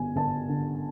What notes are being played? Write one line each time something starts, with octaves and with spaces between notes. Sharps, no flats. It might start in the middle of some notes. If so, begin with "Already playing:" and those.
Already playing: G1 G3 G#5
G1 A5
D3